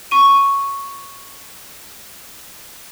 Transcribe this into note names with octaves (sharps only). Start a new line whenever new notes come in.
C#6 D#7